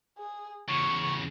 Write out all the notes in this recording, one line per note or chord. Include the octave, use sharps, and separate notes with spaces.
G#4
E2 C#3 C#6